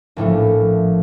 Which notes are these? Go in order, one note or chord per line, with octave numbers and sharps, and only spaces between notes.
A#1 A2 F3 A3